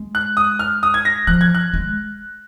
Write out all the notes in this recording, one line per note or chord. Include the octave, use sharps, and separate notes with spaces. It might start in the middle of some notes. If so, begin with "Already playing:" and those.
Already playing: G#3
F#6
D#6
F6
D#6
G#6
A#6
F3 F#6
G#6
F#6
G#3